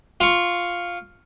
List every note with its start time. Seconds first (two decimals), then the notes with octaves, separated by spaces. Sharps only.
0.20 F4 C#6